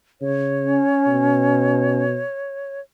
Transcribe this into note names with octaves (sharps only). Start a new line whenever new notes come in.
C#3 C#5
C#4
B2